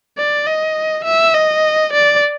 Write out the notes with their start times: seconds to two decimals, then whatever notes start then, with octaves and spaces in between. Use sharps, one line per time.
0.18 D5
0.47 D#5
1.05 E5
1.34 D#5
1.93 D5